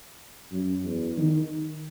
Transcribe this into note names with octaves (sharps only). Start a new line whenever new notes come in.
F#2
E2
D#3